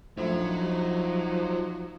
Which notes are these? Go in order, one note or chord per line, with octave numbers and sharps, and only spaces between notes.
A#1 F3 F#3 A3 D#4